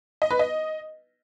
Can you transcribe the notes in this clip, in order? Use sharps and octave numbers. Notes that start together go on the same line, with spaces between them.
D#5
B4
D#5